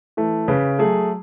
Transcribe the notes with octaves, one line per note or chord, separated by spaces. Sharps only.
E3 A3
C#3 B4
F#3 A3 G#4